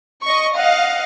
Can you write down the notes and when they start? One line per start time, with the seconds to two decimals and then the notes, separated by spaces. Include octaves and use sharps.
0.24 D#5 C#6
0.56 D#5 F5 F#5